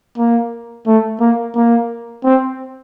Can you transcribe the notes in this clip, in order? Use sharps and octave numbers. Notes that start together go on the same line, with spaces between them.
A#3
A3
A#3
A#3
C4